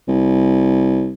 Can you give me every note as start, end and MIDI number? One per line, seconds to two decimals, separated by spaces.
0.08 1.12 36